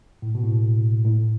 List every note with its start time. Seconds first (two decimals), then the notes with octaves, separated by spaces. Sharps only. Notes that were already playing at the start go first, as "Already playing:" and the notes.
0.22 A2
0.35 B2
0.44 A2
1.05 A2